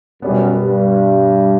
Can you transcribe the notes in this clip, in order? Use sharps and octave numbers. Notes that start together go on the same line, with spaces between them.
F#2 B2 G3 B3
G2